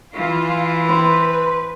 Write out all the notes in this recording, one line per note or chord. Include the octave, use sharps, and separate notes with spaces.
E3 F4
B4 C5